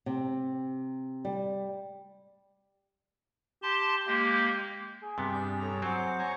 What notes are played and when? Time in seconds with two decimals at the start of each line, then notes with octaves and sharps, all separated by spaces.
0.06 C3
1.25 G3
3.63 G4 A5 C6
4.07 G#3 A#3 G4
5.03 G#4
5.18 G2 C3 B3
5.31 D4 G#5 G6
5.59 A4 C#5 A#5
5.82 F#3 C4 C5 F#5 D6
6.20 C#5 G#5 A#5